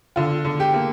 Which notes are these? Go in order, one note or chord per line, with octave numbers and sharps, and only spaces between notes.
D3 F4
D3
G4
A#3